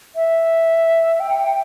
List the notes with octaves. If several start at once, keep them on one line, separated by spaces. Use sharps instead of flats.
E5
G5